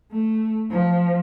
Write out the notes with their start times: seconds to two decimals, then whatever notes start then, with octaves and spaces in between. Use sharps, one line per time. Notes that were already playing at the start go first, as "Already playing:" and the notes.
0.12 A3
0.71 F3